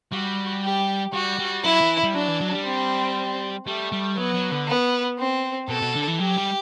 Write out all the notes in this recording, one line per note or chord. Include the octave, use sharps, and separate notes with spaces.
G3 F#4
G4
G3 F#4
G3
F#3 E4
E3
G3
F#3 D4
E3
F#3
G3
C4
G3 A3
G3
F#3 B3
F#3
D3
B3
C4
B2 A4
B2
D3
E3
F#3 G4
G3